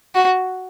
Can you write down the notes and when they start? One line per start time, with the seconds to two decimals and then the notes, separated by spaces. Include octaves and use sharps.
0.15 F#4